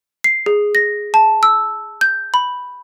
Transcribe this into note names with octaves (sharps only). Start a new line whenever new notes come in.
C7
G#4
A#6
A5
E6
G6
B5